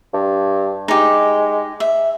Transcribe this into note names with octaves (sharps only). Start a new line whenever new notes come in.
G2
G#3 D#4 G4
E5